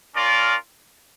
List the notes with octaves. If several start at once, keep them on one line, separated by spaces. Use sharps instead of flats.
C#4 F4 A#4 D5